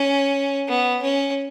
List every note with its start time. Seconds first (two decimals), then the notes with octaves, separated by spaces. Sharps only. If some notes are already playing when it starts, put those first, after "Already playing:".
Already playing: C#4
0.69 B3
1.03 C#4